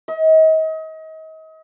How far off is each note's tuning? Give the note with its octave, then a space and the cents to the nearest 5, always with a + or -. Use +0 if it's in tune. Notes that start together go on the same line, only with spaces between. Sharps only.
D#5 +35